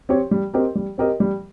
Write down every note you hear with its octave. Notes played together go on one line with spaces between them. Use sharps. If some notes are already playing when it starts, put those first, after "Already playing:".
C4 G4 C#5
G3
C4 G4 A#4 D#5
G3
C4 G4 A#4 D#5
G3